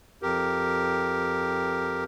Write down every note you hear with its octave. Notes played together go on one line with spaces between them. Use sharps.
F2 G4 A#4